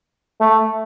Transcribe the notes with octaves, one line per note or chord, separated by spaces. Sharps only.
A3